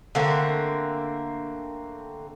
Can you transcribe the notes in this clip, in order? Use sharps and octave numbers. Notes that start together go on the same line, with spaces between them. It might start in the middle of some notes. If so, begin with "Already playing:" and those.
D3 A3 A#3 C4